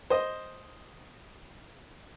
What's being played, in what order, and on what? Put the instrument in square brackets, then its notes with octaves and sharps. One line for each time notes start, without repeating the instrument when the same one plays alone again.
[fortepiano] C5 D#5